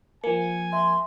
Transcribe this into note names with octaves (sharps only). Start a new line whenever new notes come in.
F3 A#3 G#5 C#7
E5 C6